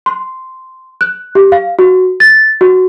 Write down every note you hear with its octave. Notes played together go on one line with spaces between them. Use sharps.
C6
F#6
G4
F5
F#4
A6
F#4